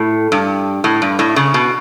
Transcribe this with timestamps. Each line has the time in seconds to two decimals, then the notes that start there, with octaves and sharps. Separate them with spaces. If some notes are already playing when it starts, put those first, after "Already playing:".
Already playing: A2
0.32 G2
0.84 A2
1.02 G2
1.19 A2
1.36 C#3
1.54 B2